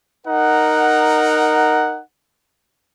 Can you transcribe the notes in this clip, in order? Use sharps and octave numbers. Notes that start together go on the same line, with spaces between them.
D#4 A#4 F#5